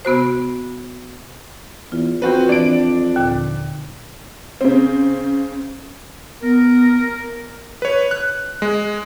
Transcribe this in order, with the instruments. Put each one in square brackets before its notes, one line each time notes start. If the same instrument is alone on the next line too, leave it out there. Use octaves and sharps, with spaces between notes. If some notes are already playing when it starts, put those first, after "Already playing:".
[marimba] C3 B3 F#4 C5
[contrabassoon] E2 [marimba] F4
[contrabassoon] F2 [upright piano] C4 F#4 B4
[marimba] E3 C4 [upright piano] D4 D7
[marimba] D#2 A#2 D3
[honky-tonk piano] C#3 C4
[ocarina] B3 [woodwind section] A#4
[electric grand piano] B4 C#5
F#6
G#3